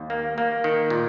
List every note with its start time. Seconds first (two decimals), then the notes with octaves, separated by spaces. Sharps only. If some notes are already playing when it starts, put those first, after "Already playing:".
Already playing: D#2
0.10 A#3
0.38 A#3
0.64 D#3
0.90 A#2